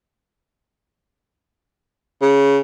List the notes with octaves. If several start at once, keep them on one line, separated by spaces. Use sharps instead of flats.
C#3